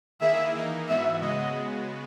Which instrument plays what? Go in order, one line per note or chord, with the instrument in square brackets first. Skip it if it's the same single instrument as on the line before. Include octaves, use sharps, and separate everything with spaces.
[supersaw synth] D#3 A#3 E4 G#4 [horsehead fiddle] E5
[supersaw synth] E3 A#3 D#4
[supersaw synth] G#2 E3 B3 F#4 [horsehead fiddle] E5
[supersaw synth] C#3 G#3 B3 F#4 [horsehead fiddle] D#5